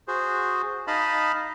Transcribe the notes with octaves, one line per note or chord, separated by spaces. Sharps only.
F#4 G#4 C5
D#4 D#5 F5 A5 B5